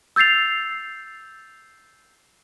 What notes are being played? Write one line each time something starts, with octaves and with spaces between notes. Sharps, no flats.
E6 G6 A6 C7 F7